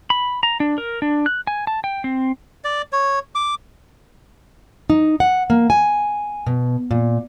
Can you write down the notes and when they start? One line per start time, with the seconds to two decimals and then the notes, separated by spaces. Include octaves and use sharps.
0.10 B5
0.43 A#5
0.60 D4
0.78 A#4
1.02 D4
1.26 F#6
1.47 G#5
1.67 A5
1.84 G5
2.04 C4
2.64 D5
2.92 C#5
3.35 D6
4.90 D#4
5.20 F#5
5.50 A#3
5.70 G#5
6.46 B2
6.91 A#2